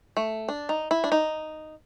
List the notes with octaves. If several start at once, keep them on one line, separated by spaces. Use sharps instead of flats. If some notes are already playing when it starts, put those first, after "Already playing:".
A3
D4
D#4
E4
D4
D#4